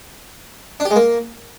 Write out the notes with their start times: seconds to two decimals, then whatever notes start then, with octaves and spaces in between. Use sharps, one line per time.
0.80 D4
0.85 G4
0.91 G#3
0.96 A#3